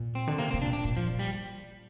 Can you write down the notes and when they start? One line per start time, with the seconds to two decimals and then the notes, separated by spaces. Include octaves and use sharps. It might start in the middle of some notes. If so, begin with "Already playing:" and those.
Already playing: A#2
0.15 C4
0.27 D3
0.38 C3 A#3
0.51 C3 C4
0.62 A#2 D4
0.73 D4
0.85 A#2
0.97 F3
1.19 G3